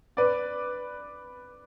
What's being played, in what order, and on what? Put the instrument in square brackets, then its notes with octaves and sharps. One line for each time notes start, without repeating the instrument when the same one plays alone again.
[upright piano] B4 D5